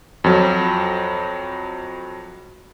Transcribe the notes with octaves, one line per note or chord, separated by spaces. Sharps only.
F2 F#3